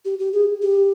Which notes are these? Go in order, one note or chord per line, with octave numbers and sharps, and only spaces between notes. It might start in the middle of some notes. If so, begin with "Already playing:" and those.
G4
G4
G#4
G4